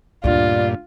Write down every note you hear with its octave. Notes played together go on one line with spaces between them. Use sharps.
D2 G2 A#2 D4 F4 D5